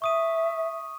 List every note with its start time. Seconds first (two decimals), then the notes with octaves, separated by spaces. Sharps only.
0.02 E5 C#6 D#6 D#7